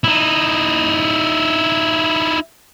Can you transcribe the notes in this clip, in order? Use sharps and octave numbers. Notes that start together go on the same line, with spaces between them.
D#4 E4